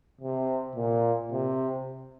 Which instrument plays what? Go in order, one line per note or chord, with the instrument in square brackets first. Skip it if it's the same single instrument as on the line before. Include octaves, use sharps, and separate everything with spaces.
[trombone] C3
A#2
C3